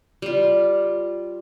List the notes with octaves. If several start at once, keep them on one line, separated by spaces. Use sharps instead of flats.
G3 F4